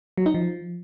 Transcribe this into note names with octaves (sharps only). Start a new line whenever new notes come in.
F#3
D#4
F3